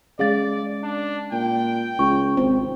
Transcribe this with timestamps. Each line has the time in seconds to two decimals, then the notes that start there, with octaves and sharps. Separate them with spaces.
0.19 G#3 C#4 G#4 D5 F5 A6
0.83 D4
1.32 A#2 G5
1.99 C#2 F4 C#6
2.37 G#1 C4